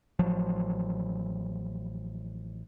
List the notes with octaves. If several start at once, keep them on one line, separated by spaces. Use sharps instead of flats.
A1 F3 F#3